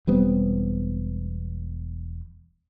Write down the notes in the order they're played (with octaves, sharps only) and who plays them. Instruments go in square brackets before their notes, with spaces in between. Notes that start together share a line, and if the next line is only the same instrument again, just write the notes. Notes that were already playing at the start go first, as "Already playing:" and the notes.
[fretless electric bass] E1 G3 B3 C4